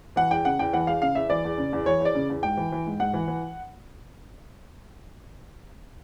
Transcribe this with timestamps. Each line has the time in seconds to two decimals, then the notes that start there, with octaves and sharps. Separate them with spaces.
0.16 E3 F#5
0.30 E2 G5
0.45 C#3 F#5
0.59 E2 G5
0.73 E3 F#5
0.87 E2 F5
1.01 C#3 F5
1.15 E2 E5
1.30 E3 D5
1.45 E2
1.58 C#3
1.73 E2
1.86 E3 C#5
2.00 E2
2.05 D5
2.15 C#3
2.30 E2
2.43 G#2 G5
2.57 E3
2.72 E3
2.86 G#2
3.00 G#2 F#5
3.14 E3
3.28 E3